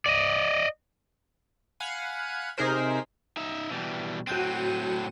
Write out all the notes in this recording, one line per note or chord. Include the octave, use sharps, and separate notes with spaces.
D5 D#5
F5 F#5 G#5 B5 C#7 D#7
C3 D#4 G#4 A#4 C5 B6
D#4 E5
B2 E3 G3
A2 F#3 C4 F#4 G6 D#7